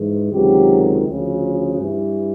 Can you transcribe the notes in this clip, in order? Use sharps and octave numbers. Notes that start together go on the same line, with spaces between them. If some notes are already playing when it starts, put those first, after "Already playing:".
Already playing: G#2 E3
C#2 C3 D#3 F#3 G4
D2 C#3 F3
G2 E3